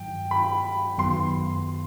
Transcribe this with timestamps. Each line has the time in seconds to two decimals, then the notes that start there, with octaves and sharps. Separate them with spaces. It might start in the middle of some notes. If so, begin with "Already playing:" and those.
Already playing: G2 D#3 F#3 G5
0.31 B5
0.98 F#2 D#3 F#3 B3 C6